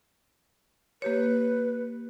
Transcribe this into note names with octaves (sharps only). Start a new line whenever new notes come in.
A#3 G4 B4 C#5